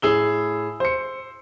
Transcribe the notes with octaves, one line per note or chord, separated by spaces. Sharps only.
A2 G#4 E6 G7
C5 C#7